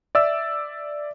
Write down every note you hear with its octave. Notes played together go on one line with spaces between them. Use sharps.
D5 E5 E6